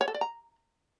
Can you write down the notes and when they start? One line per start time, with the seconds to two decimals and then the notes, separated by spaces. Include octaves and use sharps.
0.01 C#5
0.08 A4
0.14 D5
0.21 A#5